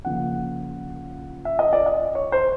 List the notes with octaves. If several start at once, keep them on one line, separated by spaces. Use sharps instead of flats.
C#3 F3 A#3 F#5
E5
D#5
D5
D#5
C#5
C5